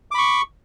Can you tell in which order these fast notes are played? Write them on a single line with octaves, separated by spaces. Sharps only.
D6 B5 C#6